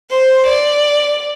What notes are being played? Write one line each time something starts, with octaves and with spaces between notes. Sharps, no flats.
C5
D5